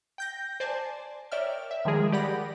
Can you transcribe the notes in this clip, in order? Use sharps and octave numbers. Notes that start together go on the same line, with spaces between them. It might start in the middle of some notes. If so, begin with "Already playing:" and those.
G5 G6 A#6
C5 D5 G#5 A5
A#4 C#5 D5 E5 G5 F6
E5
D#3 F3 G3 G#3 G#4 A#4
G4 D5 F#5 B5 A#6